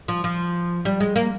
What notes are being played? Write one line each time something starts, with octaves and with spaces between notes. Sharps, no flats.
F3
F3
G3
G#3
A#3